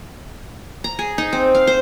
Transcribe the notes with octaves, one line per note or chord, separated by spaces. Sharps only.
A#5
G#4
D#4
C4
F5
C5